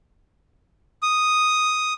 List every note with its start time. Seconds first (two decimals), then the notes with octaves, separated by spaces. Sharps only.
1.03 D#6